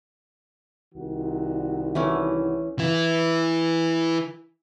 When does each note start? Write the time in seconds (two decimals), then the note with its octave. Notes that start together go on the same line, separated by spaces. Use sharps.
0.95 C2 D#3 F#4
1.95 E3 A3 C#4
2.79 E3 E4